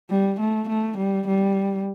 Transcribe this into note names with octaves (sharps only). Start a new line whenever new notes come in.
G3
A3
A3
G3
G3